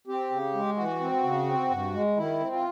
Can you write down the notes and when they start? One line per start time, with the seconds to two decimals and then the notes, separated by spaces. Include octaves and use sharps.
0.07 C4 G4
0.30 C#3
0.53 G#3
0.76 E3 F#4
1.00 C4
1.23 C#3
1.47 C4
1.70 G2
1.94 G#3
2.17 D#3 E4
2.40 C4
2.52 F4